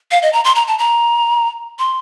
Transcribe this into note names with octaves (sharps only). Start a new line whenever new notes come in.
F5
D#5
A#5
C6
A#5
A5
A#5
C6